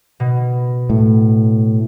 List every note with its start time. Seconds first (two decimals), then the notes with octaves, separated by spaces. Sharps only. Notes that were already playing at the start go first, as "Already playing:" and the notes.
0.20 B2
0.90 A2